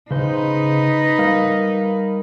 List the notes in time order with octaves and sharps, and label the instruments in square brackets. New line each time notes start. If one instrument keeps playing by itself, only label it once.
[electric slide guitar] C#3 C5 [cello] D#4 B4
[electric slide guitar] G3 A#4 F5